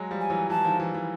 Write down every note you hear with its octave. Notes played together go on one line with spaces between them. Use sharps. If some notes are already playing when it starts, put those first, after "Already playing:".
Already playing: F#3 G#3
F3 G3
G#5
E3 F#3
E3 A5
D#3 F3
E3
E3